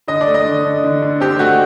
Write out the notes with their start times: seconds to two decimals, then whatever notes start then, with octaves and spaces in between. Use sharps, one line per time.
0.08 D3 D#5
0.21 D5
0.27 A3
0.34 D#5
0.45 D3
0.64 D3
0.84 D3
1.02 D3
1.20 C4 G4
1.39 A3 F#4